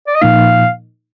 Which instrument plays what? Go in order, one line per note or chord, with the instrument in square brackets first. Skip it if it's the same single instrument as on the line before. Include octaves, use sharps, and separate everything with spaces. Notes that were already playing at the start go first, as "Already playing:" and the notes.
[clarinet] D5
D#5
[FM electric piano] A#2 F3 A#3 D#4 [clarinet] F5